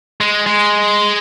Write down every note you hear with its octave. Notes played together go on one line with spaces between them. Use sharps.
G#3
G#3